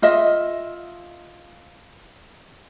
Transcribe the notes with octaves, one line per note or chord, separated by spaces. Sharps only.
F4 D#5 E5